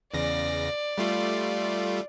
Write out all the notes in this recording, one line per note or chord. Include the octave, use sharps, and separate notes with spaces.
E2 C#3 D5 A#6
G3 A3 F4